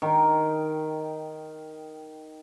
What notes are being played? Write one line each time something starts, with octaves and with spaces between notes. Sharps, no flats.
D#3 G5